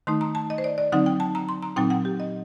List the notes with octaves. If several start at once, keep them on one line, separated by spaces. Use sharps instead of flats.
D#3 A3 D#4 C6
A#5
A5
D#5
C5
D5
D5
D3 F#3 C4 D#4 F#5
G5
A5
A#5
C6
A#5
A#2 F#3 C4 D#4 G5
F#5
G4
D#5